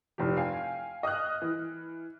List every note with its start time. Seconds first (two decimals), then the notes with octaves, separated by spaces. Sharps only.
0.18 F1 E3 F3 G4
0.37 F5 G5 G#5
1.03 D#5 D#6 F6 F#6
1.42 E3